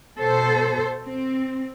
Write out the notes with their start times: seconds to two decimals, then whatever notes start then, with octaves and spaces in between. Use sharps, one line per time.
0.19 B2 A4 C5
1.04 C4